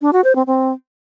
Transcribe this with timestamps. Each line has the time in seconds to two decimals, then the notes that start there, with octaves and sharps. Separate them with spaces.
0.02 D4
0.13 F#4
0.24 C5
0.35 C4
0.47 C4